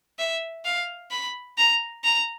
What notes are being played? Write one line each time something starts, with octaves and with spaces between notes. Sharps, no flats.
E5
F5
B5
A#5
A#5